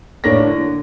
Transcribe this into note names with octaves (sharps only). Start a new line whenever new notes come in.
A2 A#3 D4 C#5 A#6
D3